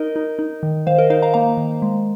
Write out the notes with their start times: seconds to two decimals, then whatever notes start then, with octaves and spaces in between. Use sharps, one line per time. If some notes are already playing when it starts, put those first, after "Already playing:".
Already playing: D#4 A#4 D#5
0.16 D#4
0.39 D#4
0.63 D#3
0.87 D#3 C5 F5
0.98 A#4 D#5
1.10 D#4 C5 F5
1.22 F5 A#5
1.34 A#3 F5 A#5
1.57 D#3
1.82 G#3